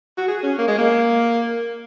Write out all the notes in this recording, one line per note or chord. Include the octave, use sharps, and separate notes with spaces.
F#4
G#4
C#4
A#3
G#3
A#3